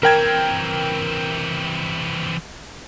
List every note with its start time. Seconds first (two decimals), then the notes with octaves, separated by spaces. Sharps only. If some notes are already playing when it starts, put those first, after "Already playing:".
0.03 E3 C4 A#4 G5 G#6